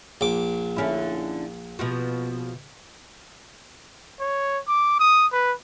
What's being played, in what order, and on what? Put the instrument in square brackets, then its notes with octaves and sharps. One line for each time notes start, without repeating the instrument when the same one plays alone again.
[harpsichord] A#1 D6
[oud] D3 C#4 E4
B2 F3 F#4
[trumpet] C#5
D6
D#6
B4